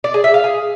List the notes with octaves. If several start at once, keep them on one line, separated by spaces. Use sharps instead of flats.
D5
G#4
E5
F5
G#4